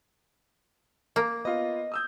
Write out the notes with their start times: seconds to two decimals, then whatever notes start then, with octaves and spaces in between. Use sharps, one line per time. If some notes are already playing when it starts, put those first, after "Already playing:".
1.16 A#3
1.45 B3 F4 D#5
1.92 D#6 E6 G6